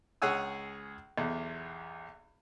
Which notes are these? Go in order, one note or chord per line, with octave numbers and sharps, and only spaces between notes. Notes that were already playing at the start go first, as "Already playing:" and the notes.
C#2 G#4 C#5 F#5 G#5 E6
B1 E2